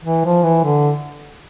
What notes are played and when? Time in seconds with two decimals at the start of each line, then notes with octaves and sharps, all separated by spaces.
0.05 E3
0.25 F3
0.43 E3
0.64 D3